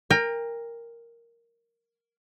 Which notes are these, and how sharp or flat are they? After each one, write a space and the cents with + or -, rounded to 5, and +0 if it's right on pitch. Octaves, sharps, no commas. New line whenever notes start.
A#4 +0 G5 +35